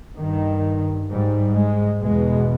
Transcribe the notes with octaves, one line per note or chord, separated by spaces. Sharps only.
G2 D#3
G#2 G3
G#3
E2 B2 G#3